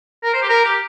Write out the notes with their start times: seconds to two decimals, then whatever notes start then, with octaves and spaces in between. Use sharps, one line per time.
0.24 A#4
0.34 C5
0.42 G4
0.49 A#4
0.65 G4